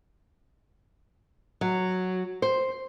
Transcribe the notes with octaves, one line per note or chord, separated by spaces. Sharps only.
F#3
C5